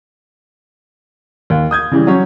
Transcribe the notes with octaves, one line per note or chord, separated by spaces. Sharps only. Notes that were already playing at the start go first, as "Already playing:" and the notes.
D#2
D#6 G6 G#6
C#3 E3 G3
F#3 C#4 C#5